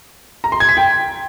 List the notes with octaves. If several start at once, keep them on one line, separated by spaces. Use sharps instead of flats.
A#5
C6
G#6
B6
G5